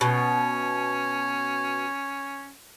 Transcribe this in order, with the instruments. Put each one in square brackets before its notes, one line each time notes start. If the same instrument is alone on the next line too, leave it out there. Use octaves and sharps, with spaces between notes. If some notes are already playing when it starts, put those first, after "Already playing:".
[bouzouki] B2 [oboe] C#4